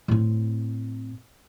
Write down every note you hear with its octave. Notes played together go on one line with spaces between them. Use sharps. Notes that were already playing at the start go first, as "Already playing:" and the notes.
A2 C4